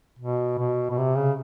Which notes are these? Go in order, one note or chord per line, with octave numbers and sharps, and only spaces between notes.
B2
B2
B2
C3
C#3